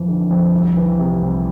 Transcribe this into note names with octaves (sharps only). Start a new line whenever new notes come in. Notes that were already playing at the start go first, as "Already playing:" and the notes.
Already playing: F2 E3 F3
D3
F2
C2
E3
C3
C2